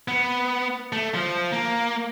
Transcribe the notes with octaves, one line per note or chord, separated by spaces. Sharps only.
B3
A3
F3
A#3